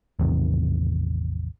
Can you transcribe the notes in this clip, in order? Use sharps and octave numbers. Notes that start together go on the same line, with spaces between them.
A1 E2 C3 D#3